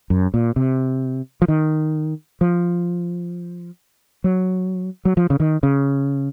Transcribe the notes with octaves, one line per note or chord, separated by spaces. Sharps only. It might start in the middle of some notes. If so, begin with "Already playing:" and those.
F#2
A#2
C3
F3
D#3
F3
F#3
F#3
F3
C#3
D#3
C#3